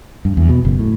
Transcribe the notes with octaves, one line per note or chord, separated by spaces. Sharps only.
G2
E2
B2
F#1
A2